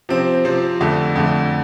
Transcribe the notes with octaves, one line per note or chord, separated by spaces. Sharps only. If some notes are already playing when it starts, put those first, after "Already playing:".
C3 F3 C4
C3 F3 C4
F2 D3 A3
F2 D3 A3